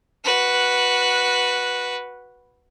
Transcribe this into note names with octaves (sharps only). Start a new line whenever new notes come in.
F#4 B4